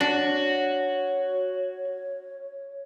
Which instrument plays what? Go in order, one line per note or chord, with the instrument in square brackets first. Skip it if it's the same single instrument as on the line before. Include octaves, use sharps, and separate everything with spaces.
[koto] D4 [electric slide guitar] F#4 [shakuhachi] C#5